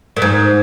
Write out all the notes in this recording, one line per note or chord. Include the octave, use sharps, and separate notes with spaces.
A#2
G#2